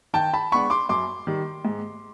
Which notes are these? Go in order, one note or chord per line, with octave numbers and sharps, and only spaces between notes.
D#3 G5 A5
A5 B5
G#3 B3 D4 B5 C#6
C6 D6
F#2 C6 D6
D#3 G3
G#2